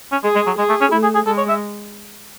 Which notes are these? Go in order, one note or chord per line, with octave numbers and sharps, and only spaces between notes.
C#4
G#3 G#4
G#3
F#3
G#3 G#4
A3
C#4
A3 E4
G#4
G#4
G#3 A4
C#5
E5